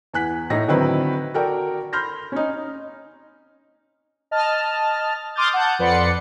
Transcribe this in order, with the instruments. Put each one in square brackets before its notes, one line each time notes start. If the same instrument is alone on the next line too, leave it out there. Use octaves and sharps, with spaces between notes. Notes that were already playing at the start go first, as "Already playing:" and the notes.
[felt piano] E2 G#5 F#6 B6
A2 D#4 A#6
D3 D#3 F#3 C4 E4 B4
F#4 A4 A#4 D5 G5
B5 C6 F6 G6 A#6
C#4 D#4
[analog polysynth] D#5 A5 F6
C6 D6 D#6 F6 G6 A6
F#5 A5 G6
F2 B4 D5 F#5 C6 C#7